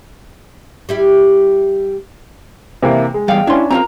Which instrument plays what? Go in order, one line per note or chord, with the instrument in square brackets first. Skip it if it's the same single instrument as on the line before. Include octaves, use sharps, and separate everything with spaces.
[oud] G3 E4 G4
[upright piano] C3 E3 A#3
G#3
[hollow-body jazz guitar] E2 G3 [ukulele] D#5 F5 G5
[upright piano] C#4 D4 [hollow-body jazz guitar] E4 C6
[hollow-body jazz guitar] C4 E4 F4 [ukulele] A#4 A#5